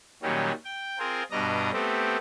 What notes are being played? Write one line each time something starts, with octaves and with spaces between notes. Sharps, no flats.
A#2 D#3 F#3 G3 C#4
G5
C4 F4 G#4 A#4
G2 B2 D4 D#5 A#5
A3 B3 C4 G4